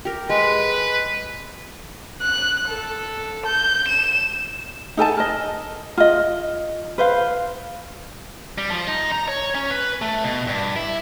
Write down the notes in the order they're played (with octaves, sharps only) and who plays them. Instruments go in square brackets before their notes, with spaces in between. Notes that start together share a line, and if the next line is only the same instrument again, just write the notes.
[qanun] G4 A#4
[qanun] G#3 [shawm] B4
[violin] F#6
A4
G6
E7
[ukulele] D#4 A4 G#5 A5
A#4 D#5
F4 D#5
B4 C5 F5
[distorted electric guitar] G3
F3
D#4
A#5
C#5
C#4
B4
A3
B2
G2
E4